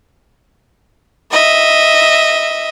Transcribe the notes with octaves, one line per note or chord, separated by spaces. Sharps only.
D#5 E5